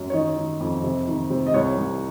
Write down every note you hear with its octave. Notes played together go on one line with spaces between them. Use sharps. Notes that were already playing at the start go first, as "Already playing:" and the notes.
Already playing: F#2
C#5
D#3 D#5
D#3
F2
C3
D#3
C3
D#5
C2 C#5
C2